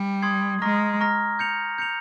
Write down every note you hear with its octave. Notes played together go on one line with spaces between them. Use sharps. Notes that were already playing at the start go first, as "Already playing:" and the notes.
Already playing: G3
C6 D#6 G#6 C7
G#3 A#5 C#6 F6 A#6
A#5 C#6 F6 A#6
G6 C#7 F7
G6 C#7 F7